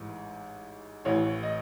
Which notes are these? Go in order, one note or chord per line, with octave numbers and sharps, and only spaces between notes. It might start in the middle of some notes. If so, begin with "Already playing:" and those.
Already playing: A1 G#2 E3
A1 A2 E3 C#5
D#5